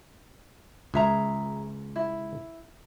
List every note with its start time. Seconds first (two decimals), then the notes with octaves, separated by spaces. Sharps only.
0.94 C#2 G#4 E5 A#5
1.96 E4